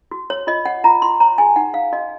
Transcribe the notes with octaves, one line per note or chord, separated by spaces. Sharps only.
F#4
C#5
F4 D#5
C#5 F#5
F4 A#5
F4 C6
C#5 A#5
G#4 G#5
D#4 F#5
D#4 F5
F#4 D#5